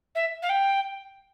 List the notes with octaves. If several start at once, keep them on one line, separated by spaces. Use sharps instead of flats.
E5
F5
G5